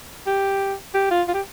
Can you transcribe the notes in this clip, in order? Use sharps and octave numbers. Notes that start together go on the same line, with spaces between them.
G4
G4
F4
F4
G4